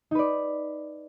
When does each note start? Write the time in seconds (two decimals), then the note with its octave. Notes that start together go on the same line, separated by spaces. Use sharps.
0.11 D#4
0.15 B4
0.19 D5